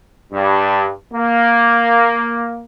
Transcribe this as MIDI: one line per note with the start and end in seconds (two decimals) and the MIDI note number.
0.32 0.89 43
1.13 2.63 58